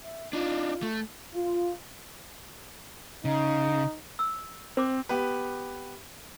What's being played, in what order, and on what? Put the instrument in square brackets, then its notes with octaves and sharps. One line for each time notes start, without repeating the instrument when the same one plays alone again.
[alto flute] E5
[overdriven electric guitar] D4 D#4 [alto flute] F4
[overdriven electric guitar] A3
[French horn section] F4
[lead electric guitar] C#3 [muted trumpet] D#4
[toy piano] E6
[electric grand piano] C4 [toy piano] C5 D6
[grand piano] B3 G4 B4